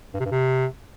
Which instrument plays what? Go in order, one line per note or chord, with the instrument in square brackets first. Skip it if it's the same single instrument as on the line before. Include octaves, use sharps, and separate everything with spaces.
[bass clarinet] G2
C3
G2
C3